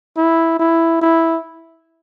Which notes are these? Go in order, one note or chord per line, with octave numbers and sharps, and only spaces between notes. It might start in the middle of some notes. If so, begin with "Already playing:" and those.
E4
E4
E4